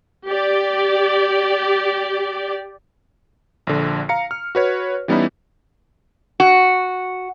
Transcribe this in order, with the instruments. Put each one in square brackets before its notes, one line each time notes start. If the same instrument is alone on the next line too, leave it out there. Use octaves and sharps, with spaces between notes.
[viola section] G4 D5
[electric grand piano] A#1 D3
F5 A#5 C#7
F6
F#4 B4 C#5
E3 G3 B3 C#4 D#4 E4
[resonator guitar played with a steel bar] F#4